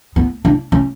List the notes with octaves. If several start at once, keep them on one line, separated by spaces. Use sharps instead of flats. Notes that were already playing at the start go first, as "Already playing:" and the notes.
B3
D4
C#4